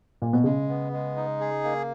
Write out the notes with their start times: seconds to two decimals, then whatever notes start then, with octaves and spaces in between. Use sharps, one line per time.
0.22 A#2
0.33 B2
0.44 C#3 G#3
0.68 B3
0.93 G#3
1.16 D#4
1.40 G#4
1.64 A#3